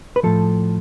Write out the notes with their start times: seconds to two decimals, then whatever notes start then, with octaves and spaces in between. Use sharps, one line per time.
0.16 B4
0.23 A2 F3 A4